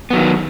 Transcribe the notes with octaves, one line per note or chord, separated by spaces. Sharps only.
D#3 F#3 B3